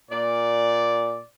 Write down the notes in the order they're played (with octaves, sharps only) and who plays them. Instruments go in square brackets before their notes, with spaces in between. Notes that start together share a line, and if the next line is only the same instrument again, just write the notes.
[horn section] A#2 D5